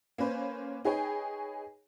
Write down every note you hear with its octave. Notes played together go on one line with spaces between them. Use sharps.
A#3 C#4 B4 C5
D#4 G#4 B4 C#5 G5